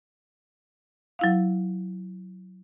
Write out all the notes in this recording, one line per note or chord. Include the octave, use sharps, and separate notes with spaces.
F#3 E4 F5